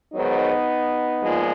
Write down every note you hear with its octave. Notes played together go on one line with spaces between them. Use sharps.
G#2 D#3 F#3 B3 D#4
A#2 F3 G#3